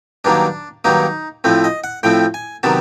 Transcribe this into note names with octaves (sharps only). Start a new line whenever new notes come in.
G2 D#3 F#3 A#3 D4
G2 D#3 F#3 A#3 D#4
A2 F3 A3 C4
D#5
F#5
A2 F3 A3 C4 G5
G#5
C3 D#3 F#3 B3 A5